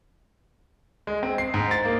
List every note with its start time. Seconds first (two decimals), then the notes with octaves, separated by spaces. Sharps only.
1.07 G#3
1.23 C4
1.38 C7
1.54 G#2
1.71 A6
1.85 A#3